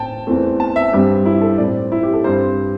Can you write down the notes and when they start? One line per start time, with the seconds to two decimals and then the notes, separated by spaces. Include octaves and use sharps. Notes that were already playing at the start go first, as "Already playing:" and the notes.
Already playing: A2 A3 C4 G5 A5
0.27 E2 E3 A3 C4
0.60 A5
0.76 E5
0.92 G2 G3 C4 G4
1.26 E4
1.42 A4
1.58 A2 A3 C4 D5
1.92 E4
2.03 G4
2.14 A4
2.24 G2 G3 C4 C5